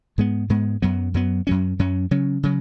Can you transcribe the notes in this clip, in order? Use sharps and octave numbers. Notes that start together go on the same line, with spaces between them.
G#2 G#3 B3
G#2 G#3 B3
F#2 F#3 B3
F#2 F#3 B3
F#2 F#3 C#4
F#2 F#3 C#4
C#3 F#3 C#4
C#3 F#3